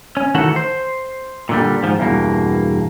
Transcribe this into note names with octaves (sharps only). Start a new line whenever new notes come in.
C#4
D#3 E3 A3 F#4 A4 F#5
C5
A#2 D3 G3
G#2 F3
E2 G2 B2 A#3